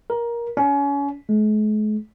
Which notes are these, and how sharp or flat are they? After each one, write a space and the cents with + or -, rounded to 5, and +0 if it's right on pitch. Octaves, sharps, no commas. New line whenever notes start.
A#4 +15
C#4 +30
G#3 +45